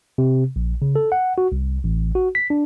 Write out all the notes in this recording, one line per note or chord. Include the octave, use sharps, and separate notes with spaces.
C3
A#1
C#3
A4
F#5
F#4
C2
A1
F#4
B6
D4